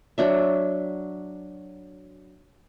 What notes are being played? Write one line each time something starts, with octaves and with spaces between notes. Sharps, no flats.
F#3 D4 E5